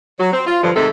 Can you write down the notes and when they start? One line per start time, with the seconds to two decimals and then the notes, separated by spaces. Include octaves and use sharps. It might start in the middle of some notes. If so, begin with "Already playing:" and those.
0.20 F#3
0.33 C4
0.47 F4
0.63 G2 D3 F3
0.76 G#2 C3 D#3 A3 C4 A4